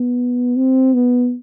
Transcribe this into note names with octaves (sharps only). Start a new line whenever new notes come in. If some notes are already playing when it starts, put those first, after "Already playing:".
Already playing: B3
C4
B3